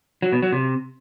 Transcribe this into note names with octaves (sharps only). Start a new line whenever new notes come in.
F#3
B2
F#3
C3